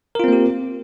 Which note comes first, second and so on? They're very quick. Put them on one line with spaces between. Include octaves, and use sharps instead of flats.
A#4 F4 C4 A#3 G4